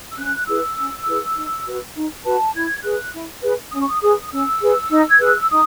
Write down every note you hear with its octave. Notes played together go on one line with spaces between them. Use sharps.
E6
C#4 F#6
E4 G#4 B4 E6
C#4
E4 G#4 B4
D#4
F#4 B4
D#4
F#4 B4 A5
E4 G#6
G#4 B4 F#6
E4
G#4 B4
C#4 D#6
C#6
D#6
G#4 B4 D#6
C#4 E6
G#4 B4
D#4
G#6
G#4 B4 F#6
E6
D#4 D#6